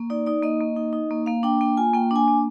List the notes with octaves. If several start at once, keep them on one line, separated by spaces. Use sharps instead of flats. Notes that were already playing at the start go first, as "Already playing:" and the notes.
Already playing: A#3
D#4 D5
D#4 D5
A#3 D#5
A#3
D#4
D#4
A#3
A#3 F5
D4 G5
A#3 G5
F4 G#5
A#3 G5
D4 G#5
A#3